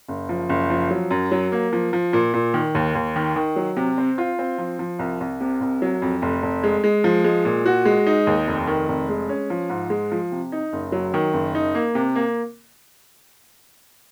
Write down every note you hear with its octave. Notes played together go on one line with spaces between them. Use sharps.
F#1
F3
F#1
F3
F#3
F#2
F#3
A#3
F3
F3
A#2
A#2
D#3
D#2
D#2
D#3
D#3
F#3
C3
C4
F4
C4
F3
F3
C2
C2
C3
C2
F#3
F2
F1
F1
G#3
G#3
F3
G#3
A#2
F#4
G#3
D#4
D#2
F1
D#3
F1
G#3
C#4
F3
G#2
G#3
F3
C3
D#4
F#1
F#3
D#3
F#1
D#4
A#3
C3
A#3